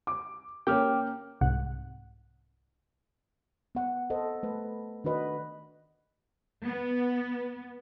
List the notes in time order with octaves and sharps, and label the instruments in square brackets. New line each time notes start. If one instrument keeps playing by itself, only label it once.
[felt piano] D6
[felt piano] A#3 C#4 [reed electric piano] G5 D6 F6
[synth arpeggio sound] C2 G#2 C3 F#5 F#6
[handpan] B3 F#5
A4 C5 D#5
A3 B4
D#3 D4 F#4 B4 D#5
[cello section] B3